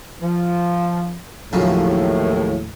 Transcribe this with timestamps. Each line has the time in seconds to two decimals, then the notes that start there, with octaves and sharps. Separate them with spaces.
0.22 F3
1.53 D#2 A2 C#3 F3 F#3